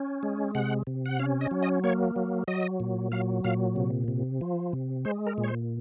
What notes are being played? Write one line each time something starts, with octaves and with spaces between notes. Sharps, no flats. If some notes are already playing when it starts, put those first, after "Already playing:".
Already playing: C#4
G#3
C3 F#5
C3
F#5
C#4 F5
D#5
F#3
D#5
A#3 C#5
F#3
F#3 D#5
A#2
F#3 F5
A#2 F5
C3
C3
F3
C3
G#3 C5
A#4
A#2
C#5
C5